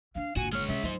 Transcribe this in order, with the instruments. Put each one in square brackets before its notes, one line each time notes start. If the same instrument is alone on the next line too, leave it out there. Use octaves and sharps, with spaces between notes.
[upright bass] E3 D4 [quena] F5
[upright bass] G1 A#2 [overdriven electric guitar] F#4 [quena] G#5
[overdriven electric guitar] G#3 C#5 [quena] F6
[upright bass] C3 C#4 [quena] E5
[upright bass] F3 F#3 [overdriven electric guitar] D#4 C5